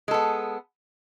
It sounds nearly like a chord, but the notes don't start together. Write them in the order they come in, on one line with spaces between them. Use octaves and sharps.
G#3 A4 B3